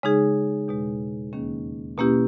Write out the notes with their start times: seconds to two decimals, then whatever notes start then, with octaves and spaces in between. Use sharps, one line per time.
0.03 C#3 G#3 D#4 G#4
0.68 E2 B2 G#3
1.33 D#2 D#3 A#3 C#4 G#4
1.98 B2 A#3 C#4 E4 G4